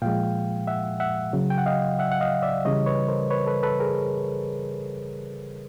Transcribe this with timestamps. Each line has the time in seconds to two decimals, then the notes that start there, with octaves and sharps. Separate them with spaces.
0.02 A#2 F3 G#3 F5 G5
0.67 E5 F#5
1.00 E5 F#5
1.33 C#3 F#3
1.50 G5
1.58 F#5
1.66 D#5 F5
1.99 E5 F#5
2.12 F#5
2.21 D#5 F5
2.42 D5 E5
2.65 C#3 E3 G3 C#5 D#5
2.86 B4 C#5
3.08 A#4 C5
3.30 B4 C#5
3.46 A4 B4
3.63 A4 B4
3.80 G#4 A#4